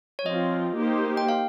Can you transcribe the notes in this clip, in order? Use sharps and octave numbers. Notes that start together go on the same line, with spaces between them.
C#5
F3 C4 F4 D#5
A#3 D#4 G4 C5
G5
F5